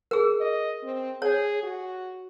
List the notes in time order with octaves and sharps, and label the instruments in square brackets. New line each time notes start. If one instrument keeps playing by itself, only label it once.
[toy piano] G#4 A#4
[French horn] D#5
C4
[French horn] G#4 [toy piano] C#5
[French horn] F#4